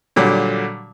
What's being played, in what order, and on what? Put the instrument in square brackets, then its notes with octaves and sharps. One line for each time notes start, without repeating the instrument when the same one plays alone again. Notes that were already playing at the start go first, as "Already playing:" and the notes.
[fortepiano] A#2 D3 F#3 G3